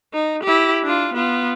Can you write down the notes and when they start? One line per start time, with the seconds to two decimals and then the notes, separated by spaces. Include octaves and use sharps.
0.13 D#4
0.43 E4 G4
0.84 D4 F4
1.14 B3 F4